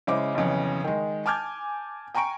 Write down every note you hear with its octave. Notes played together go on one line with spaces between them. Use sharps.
C#3 G#3 E4 C5 D6
B1 F2 C#3 E3
D#3 G#3
G#5 A5 D6 F6 G6 G#6
G5 G#5 A#5 C#6 D7